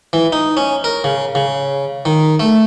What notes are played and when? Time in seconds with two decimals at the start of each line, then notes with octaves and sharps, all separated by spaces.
0.13 E3
0.32 D#4
0.57 C#4
0.84 A#4
1.04 C#3
1.35 C#3
2.05 D#3
2.40 A3